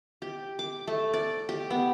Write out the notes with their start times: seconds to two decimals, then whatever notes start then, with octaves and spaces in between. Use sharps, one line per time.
0.22 G4
0.59 D6
0.87 A3
1.14 D5
1.49 G4
1.70 B3